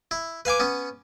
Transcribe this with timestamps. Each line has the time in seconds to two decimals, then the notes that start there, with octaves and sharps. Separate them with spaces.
0.11 E4
0.45 B4 F5 G#5 D6
0.60 B3 C#4